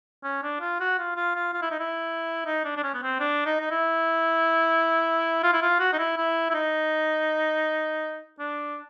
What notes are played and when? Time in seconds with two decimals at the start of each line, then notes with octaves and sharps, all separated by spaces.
0.24 C#4
0.43 D4
0.60 F4
0.80 F#4
0.98 F4
1.16 F4
1.35 F4
1.54 F4
1.62 E4
1.71 D#4
1.80 E4
2.46 D#4
2.65 D4
2.77 D4
2.83 C#4
2.94 B3
3.02 C4
3.20 D4
3.46 D#4
3.60 D#4
3.70 E4
5.43 F4
5.53 E4
5.62 F4
5.79 F#4
5.93 D#4
5.99 E4
6.17 E4
6.50 E4
6.54 D#4
8.39 D4